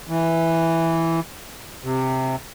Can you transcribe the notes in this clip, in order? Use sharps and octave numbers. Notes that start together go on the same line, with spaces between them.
E3
C3